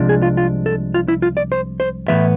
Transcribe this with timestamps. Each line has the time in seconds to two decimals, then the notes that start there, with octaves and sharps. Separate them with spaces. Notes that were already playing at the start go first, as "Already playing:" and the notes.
Already playing: C2 C3 F3 G#3 D4
0.09 G#4
0.22 F4
0.37 F4
0.66 A4
0.94 F4
1.08 E4
1.22 F4
1.37 D5
1.52 C5
1.80 C5
2.08 A2 E3 G#3 B3 E5